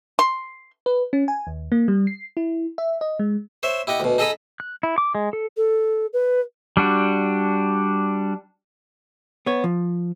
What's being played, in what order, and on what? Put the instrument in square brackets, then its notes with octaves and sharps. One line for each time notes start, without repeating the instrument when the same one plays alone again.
[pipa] C6
[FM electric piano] B4
C#4
G#5
D#2
A#3
G3
C7
E4
E5
D#5
G#3
[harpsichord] C5 C#5 E5
E4 G4 D#5 F#5
D2 B2
D#4 G#4 A4 D#5 B5 D#6
[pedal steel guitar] F#6
E4
D6
G#3
A4
[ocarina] A4
B4
[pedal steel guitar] G3 D4 F#4
[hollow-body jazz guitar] B3 C#5
F3